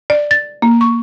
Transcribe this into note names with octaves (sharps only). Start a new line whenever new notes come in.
D5
A6
A#3
C#6